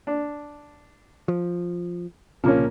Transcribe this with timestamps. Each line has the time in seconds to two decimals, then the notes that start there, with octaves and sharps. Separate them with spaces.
0.07 D4
1.28 F3
2.44 C2 A#2 C#3 F3 A#3 C#4